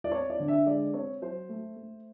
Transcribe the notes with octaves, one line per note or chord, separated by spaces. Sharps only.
D5
C4 C#5
D5
D3
E5
G#3 D5
C4 C#5
F#3 C5
A3
A3